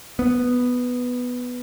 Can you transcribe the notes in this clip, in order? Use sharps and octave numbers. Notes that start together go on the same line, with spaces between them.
B3